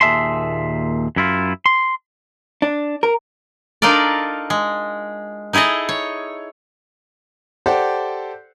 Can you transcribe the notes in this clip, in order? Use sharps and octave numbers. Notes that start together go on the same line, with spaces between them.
D#2 A#2 G#4 E5 A5 C6
F#2 E4 F4
C6
D4
A#4
D4 D#4 F4 A4 A#4 D5
G#3
D#4 E4 G#4 A4 D#5
C#5
G4 A4 C5 D5 F#5